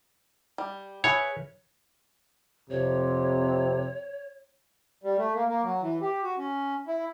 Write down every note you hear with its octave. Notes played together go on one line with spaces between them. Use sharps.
G3
G#4 B4 C#5 E5
F2 C3 C#5
G3
A3
A#3
A#3
F#3
E3
G4
F#4
C#4
E4